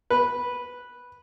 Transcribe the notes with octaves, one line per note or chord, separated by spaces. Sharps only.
B4